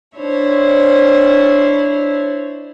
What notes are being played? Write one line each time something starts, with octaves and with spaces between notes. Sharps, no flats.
D4 E4 C5 C#5